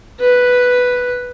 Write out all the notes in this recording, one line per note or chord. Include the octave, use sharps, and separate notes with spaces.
B4